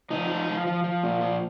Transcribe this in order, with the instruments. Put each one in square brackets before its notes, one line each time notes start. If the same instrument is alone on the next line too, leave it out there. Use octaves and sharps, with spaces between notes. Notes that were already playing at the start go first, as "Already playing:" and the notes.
[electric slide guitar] F3 D#4
F3
F3
F3
F3
A#2
F3